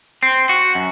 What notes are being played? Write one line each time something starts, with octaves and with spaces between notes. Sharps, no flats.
C4
F#4
F#2